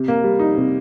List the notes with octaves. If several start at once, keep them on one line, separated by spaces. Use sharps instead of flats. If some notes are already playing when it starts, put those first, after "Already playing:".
Already playing: C3
A#3
G3
D#4
C3